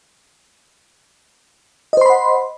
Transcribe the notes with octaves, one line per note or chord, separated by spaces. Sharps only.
C5 D#5 F#5 B5 C6